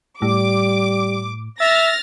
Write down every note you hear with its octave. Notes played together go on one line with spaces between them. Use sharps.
A2 G3 D6
E5 F6 A6 A#6